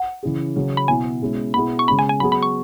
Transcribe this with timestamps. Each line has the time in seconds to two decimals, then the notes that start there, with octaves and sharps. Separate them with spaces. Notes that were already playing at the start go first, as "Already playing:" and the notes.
Already playing: F#5
0.23 C#3 E3 C#4 G#4
0.56 C#3 F#3 C#4
0.77 B5
0.88 B2 B3 E4 G#5
1.22 B2 G#3 C#4 E4
1.54 B2 B3 E4 G#4 B5
1.79 C#6
1.88 C#3 G#3 C#4 B5
1.99 G#5
2.09 G#5
2.20 F#3 B3 G#4 B5
2.32 B5
2.43 C#6